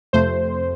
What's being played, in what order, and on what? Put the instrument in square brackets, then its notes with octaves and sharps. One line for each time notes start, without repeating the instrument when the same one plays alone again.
[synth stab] F2 C3 A3 C5